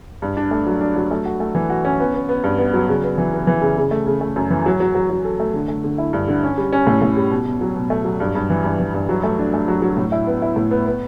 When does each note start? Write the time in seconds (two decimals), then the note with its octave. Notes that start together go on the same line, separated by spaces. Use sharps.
0.22 G2
0.37 D4
0.51 A3
0.66 F#3
0.81 D4
0.96 F#3
1.11 A3
1.25 F#4
1.40 A3
1.55 E3
1.70 F#4
1.85 C#4
2.00 B3
2.14 B3
2.29 B3
2.44 G2
2.58 B3
2.73 F#3
2.88 C#3
3.03 B3
3.18 E3
3.33 B3
3.47 E3
3.61 C#3
3.77 C#3
3.91 A3
4.06 C#3
4.21 A3
4.36 F#2
4.50 E3
4.66 F#3
4.80 F#3
4.95 F#3
5.10 F#3
5.24 A4
5.40 A3
5.54 D3
5.68 A3
5.84 D3
5.98 E4
6.13 G2
6.28 D3
6.43 C#4
6.58 G3
6.73 C#4
6.87 A2
7.02 A2
7.17 G3
7.31 B2
7.46 B2
7.61 F#3
7.76 B2
7.90 A3
8.05 F#3
8.20 G2
8.35 G2
8.50 E3
8.64 G2
8.79 E3
8.94 G2
9.09 F#3
9.23 A3
9.39 D4
9.54 A3
9.68 F#3
9.82 F#3
9.97 A2
10.12 E4
10.27 B3
10.42 E4
10.56 A2
10.71 B3
10.86 B3